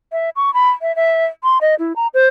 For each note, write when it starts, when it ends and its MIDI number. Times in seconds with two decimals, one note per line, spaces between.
0.12 0.30 76
0.36 0.53 85
0.54 0.71 83
0.82 0.95 76
0.96 1.25 76
1.43 1.58 84
1.61 1.75 75
1.79 1.93 64
1.96 2.07 82
2.14 2.27 72